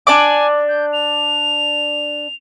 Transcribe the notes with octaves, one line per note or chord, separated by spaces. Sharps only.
D4 D5 G#5 D6
G6
F7